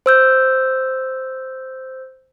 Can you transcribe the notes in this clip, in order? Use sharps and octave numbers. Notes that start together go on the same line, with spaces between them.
C5 E6 G6